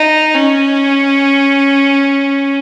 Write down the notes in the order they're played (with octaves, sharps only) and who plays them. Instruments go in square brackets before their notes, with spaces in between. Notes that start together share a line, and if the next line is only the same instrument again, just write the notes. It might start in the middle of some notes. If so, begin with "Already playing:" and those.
Already playing: [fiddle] D#4
C#4